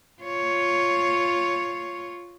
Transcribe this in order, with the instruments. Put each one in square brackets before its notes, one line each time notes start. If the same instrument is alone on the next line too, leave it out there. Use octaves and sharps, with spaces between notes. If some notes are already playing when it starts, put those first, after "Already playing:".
[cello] F4 C#5